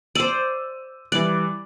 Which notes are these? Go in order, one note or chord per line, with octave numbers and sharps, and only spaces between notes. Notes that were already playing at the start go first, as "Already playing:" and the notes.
C5 D5 E6 D#7
E3 G3 D5 F#6